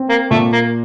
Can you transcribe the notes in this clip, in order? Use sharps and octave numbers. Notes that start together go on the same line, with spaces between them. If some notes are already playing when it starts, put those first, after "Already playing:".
Already playing: C4
A#3
A#2 A3
A#3